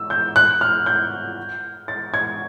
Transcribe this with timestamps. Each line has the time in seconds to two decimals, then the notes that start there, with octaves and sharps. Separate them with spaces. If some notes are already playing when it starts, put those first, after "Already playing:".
Already playing: E6
0.10 G6
0.36 F#6
0.61 F6
0.86 G6
1.88 A6
2.14 G#6